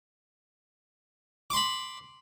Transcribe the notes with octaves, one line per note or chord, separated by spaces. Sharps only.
B5 C6 D6